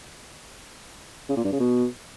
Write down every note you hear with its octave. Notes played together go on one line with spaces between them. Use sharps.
C#3
A#2
G2
C#3
B2